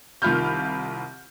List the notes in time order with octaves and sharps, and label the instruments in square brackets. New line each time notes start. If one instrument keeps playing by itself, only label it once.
[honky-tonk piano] C2 D#3 F4 B5 F6 G6